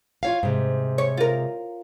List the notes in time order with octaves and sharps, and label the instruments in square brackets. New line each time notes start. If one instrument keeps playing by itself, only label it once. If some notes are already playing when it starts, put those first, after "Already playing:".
[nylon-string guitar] F4 C#5 F5
G#2 C3
[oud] C#5
F4 A#4